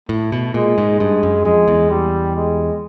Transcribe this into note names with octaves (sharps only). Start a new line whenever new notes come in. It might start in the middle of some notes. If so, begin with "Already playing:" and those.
A2 A3
B2
A#2 G#3
G#2
G2 G#3
F#2
F2 G#3
E2
G3
G#3